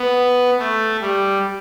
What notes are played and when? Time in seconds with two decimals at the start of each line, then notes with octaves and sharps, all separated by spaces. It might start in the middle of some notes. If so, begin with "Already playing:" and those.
Already playing: B3
0.59 A3
1.01 G3